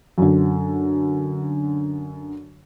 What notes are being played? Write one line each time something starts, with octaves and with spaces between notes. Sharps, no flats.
F#2 D3